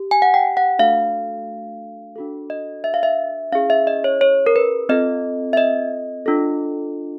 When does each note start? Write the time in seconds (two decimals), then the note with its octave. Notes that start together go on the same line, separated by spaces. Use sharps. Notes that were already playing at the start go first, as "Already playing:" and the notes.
Already playing: G4
0.11 G#5
0.22 F#5
0.34 G5
0.57 F#5
0.79 A3 D4 F#4 A4 F5
2.16 D4 F#4 A4
2.50 D#5
2.84 E5
2.94 F5
3.03 E5
3.52 C#4 E4 G#4 F5
3.70 E5
3.87 D#5
4.04 C#5
4.21 C#5
4.47 A#4
4.56 B4
4.89 C4 F4 A4 D#5
5.53 E5
5.57 D#5
6.26 D4 F4 A4